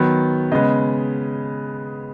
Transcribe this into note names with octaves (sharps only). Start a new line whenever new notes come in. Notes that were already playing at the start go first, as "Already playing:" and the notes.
Already playing: D#3 F#3 B3
C#3 G#3 B3 D#5